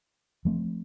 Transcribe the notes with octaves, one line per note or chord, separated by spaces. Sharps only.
F3 A3 C4